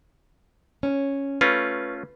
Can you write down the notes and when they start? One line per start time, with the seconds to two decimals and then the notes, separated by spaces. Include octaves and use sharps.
0.83 C#4
1.41 A3 C#4 F4 B4